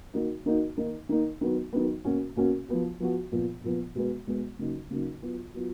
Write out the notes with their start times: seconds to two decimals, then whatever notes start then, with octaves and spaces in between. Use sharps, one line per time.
0.14 D#3 A#3 D#4 F#4
0.46 D#3 A#3 D#4 F#4
0.77 D#3 A#3 D#4
1.09 D#3 A#3 D#4
1.41 D#3 F#3 B3
1.73 D#3 F#3 B3
2.05 B2 A#3 C#4 F#4
2.36 B2 A#3 C#4 F#4
2.68 F3 B3 F#4
3.00 F3 B3 F#4
3.32 A#2 F3 B3
3.63 A#2 F3 B3
3.95 B2 G#3 B3
4.27 B2 G#3 B3
4.59 C#3 F#3 A#3 D#4
4.90 C#3 F#3 A#3 D#4
5.22 F#3 B3 F4
5.54 F#3 B3 F4